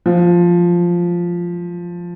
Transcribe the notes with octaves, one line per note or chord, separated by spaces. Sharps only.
F3